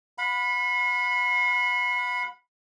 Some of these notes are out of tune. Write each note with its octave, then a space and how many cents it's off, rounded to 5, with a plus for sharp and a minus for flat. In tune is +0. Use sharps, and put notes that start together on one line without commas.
F#5 -45 B5 +0